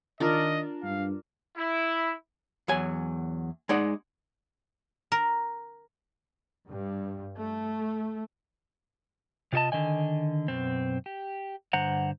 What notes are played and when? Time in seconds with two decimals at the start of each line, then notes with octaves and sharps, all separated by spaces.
0.20 D#3 D4 F4 A#4 D#5
0.83 G2 F5
1.56 E4
2.68 E2 F#3 G#5
3.69 G#3 D#4 D5 F#5
5.12 A#4
6.68 G2
7.36 A3
9.53 C3 F4 F#4 D#5 A5
9.72 D3 D#3 D#5 G#5
10.48 F#2 B2 C4
11.06 G4
11.73 G2 D3 C5 F#5 A#5